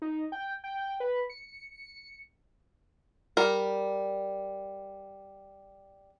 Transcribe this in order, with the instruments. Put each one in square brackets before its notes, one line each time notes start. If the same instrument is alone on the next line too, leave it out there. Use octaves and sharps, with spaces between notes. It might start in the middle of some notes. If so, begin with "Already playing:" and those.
[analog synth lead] D#4
G5
G5
B4
C#7
[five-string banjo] G3 A#4